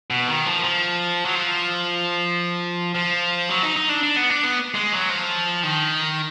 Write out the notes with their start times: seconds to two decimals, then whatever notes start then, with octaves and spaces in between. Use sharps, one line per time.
0.10 B2
0.28 D#3
0.46 F3
0.64 F3
1.26 F#3
1.35 F3
2.95 F3
3.50 F#3
3.63 D#4
3.76 D#4
3.89 D4
4.03 D4
4.16 B3
4.30 D4
4.43 B3
4.75 G#3
4.93 F#3
5.10 F3
5.64 D#3